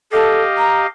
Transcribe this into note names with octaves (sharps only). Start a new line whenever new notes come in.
G4 A4 D#5 F5
A#5